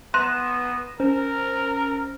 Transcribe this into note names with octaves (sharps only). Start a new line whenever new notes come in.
B3 C6 F#6 A#6 D#7 E7
C#4 A#4 C5